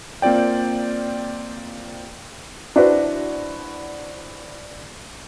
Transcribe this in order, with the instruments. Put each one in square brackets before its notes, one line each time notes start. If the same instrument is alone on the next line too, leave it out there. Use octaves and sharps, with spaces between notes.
[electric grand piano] A#3 C4 F4 D5 G5
[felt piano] D4 E4 F#4 B4 C5 D5